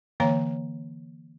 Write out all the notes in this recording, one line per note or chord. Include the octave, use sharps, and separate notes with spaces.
D3 E3 A#3 C#5 F5 A#5